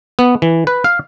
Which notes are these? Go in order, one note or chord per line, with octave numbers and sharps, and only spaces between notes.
B3
E3
B4
F5